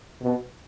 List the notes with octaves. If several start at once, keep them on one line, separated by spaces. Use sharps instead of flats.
B2